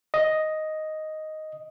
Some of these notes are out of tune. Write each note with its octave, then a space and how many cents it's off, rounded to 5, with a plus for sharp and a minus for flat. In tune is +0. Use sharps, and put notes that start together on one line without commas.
D#5 +5